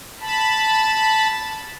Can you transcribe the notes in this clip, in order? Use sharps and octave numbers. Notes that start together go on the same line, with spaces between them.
A5 B5